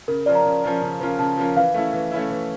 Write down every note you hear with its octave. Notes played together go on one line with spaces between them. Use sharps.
C#3 A#4
F3 C#4 F4 A#4 D5
A#5
C#3
F3 C#4 F4 A#4
C#3
F3 C#4 F4 A#4
C#3 A5
F3 C#4 F4 A#4
E3 F5
A3 C#4 E4
E3
A3 C#4 E4
E3